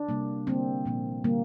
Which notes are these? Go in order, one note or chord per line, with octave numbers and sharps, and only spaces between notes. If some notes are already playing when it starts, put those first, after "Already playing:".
Already playing: D4
C3 G3 A#3
D3 G3 A#3 C4
A#2 F3 A#3
D3 G3 A#3